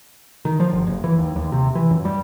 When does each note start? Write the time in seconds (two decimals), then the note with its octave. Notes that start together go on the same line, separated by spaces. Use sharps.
0.45 D#3
0.60 F3
0.73 G1
0.87 F#1
1.04 E3
1.18 D#2
1.36 D#2
1.52 C3
1.75 E3
1.91 F#2
2.05 G3